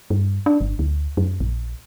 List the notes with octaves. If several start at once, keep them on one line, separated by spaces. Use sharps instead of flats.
G2
D4
G1
D2
F#2
A#1